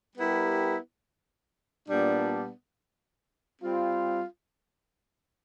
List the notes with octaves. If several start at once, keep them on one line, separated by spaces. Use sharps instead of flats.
G3 B3 E4 G4 A#4
A#2 G3 B3 D4
G3 C4 F4